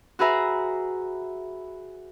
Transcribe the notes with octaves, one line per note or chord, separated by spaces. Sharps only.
F#4 G#4 B4 E5 A#5